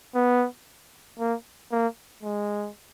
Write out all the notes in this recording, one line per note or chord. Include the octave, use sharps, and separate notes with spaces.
B3
A#3
A#3
G#3